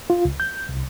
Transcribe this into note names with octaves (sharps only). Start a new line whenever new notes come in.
F4
C#2
G6
C2